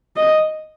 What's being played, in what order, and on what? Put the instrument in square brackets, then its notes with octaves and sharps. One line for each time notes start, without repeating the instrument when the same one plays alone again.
[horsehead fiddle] D#5